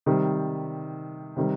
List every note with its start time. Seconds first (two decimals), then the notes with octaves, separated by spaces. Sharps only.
0.06 C3 D#3 G3
1.37 C3 D#3 G3